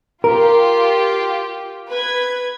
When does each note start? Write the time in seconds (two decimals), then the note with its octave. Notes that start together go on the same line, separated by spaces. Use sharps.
0.24 F4 G4 A#4
1.91 B4 G#6